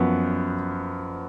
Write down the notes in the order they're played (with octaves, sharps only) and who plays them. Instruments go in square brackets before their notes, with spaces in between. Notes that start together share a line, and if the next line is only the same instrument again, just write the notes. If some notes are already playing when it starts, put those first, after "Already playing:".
Already playing: [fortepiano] F#2 F3 B3